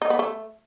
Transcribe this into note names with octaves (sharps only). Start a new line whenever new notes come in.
D#4
B3
A3